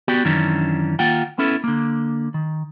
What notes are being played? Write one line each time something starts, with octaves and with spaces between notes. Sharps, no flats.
B3 F#4 G4 D5 G5
F#2 D#3 E3 C#4 D4
D#3 A#3 F4 F#5 G5
B3 C#4 E4 A4
D3 A#3
D#3